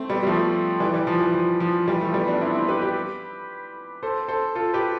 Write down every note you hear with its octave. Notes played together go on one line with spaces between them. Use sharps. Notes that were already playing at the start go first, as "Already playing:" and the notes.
Already playing: A3 C4
G3 B3
G3
F3 A3
E3 G3
E3 G3
F3
E3
F3
F3
E3 G3
F3 A3
G3 B3
B3 D4
C4 E4
C4 E4
G4 B4
G4 B4
A4 C5
A4 C5
F4 A4
G4 B4